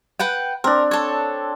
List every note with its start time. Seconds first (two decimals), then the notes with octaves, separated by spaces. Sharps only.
0.19 B4 F#5 G5
0.64 C4 D4 A#4
0.91 A4 C#5